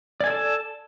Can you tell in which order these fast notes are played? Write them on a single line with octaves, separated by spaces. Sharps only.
D5 G#5 A4 A5